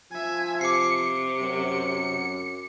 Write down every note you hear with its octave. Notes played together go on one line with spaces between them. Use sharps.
F3 E5 G#5
C3 D6 C7 C#7
F#2 C#7